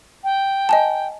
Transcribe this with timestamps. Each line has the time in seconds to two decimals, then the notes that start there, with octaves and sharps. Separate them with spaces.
0.24 G5
0.69 D#5 G#5 A5